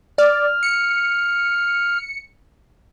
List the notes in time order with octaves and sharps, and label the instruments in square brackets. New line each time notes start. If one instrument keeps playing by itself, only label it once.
[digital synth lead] D5 [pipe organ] F6
[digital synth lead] C#7